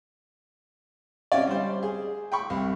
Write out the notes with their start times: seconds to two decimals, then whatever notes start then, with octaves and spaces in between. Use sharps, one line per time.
1.32 C3 C#4 C#5 D5
1.47 G3 C5
1.83 G#4
2.32 G5 B5 C#6
2.50 C2